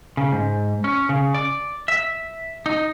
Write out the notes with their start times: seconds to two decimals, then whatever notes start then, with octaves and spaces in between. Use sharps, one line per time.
0.17 C#3
0.32 G#2
0.84 C#4
1.09 C#3
1.35 D5
1.88 E5
2.66 D#4